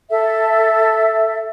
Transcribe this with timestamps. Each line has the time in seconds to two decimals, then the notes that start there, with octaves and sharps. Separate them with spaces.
0.10 A4 E5